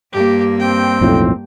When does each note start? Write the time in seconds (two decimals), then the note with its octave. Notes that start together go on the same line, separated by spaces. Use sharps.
0.12 G2 A#3 G4
0.59 C4 G5
1.01 B1 F2 A2